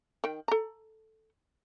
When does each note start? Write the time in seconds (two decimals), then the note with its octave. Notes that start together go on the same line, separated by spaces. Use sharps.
0.24 D#3 G5
0.48 A4 A#5